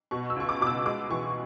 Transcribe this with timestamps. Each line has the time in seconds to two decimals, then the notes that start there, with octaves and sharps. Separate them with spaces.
0.11 B2 C#6
0.30 E6
0.36 C#2 C#6
0.49 D6
0.61 B2 D6
0.67 E6
0.86 G#3 D6
1.11 E3 C#6